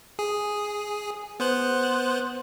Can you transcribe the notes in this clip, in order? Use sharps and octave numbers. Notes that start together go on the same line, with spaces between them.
G#4
B3 C5 F#6